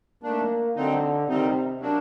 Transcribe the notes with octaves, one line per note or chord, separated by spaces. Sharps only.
D#3 A3 A#3 D4
D3 F#3 C4 D#4
C3 D#3 G3 C4 D#4
F#3 A#3 D4